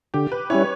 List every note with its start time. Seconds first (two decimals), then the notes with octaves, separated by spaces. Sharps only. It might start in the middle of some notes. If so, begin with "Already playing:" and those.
0.14 D3 G4
0.32 B4
0.50 G3 C#4 E4 C#5